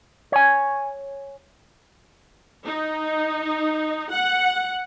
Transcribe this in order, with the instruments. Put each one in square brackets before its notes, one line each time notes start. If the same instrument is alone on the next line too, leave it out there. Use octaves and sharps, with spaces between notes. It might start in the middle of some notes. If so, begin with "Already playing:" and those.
[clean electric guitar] C#5 G#5
[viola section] D#4
F#5